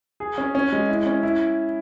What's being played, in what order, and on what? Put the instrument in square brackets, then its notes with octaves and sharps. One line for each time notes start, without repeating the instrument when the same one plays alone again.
[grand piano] G#4
C#4
C#4
G#3
E4
C#4
E4